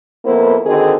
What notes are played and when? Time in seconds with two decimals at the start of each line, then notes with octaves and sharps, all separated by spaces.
0.25 F2 A#3 B3 E4 A#4 C5
0.66 D3 D#3 C4 D#4 F#4 G#4